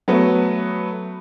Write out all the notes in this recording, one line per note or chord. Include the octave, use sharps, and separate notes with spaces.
F#3 A3 B3